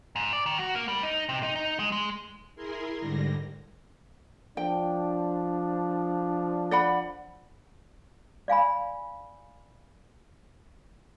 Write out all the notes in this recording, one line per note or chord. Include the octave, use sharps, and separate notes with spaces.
G#2
D5
D#3
F#4
A#3
G3
D#4
C3
D#4
D#4
G#3
G#3
E4 G#4 A#4 G#5 C6
G#2 D3 G3 A#6
F3 D4 G5
D5 F#5 B5
D5 F5 G#5 B5